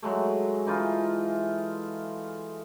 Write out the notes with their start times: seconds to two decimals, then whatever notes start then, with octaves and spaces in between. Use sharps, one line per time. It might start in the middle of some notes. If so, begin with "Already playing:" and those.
0.02 F#3 G#3 A3
0.67 E3 D#4 F4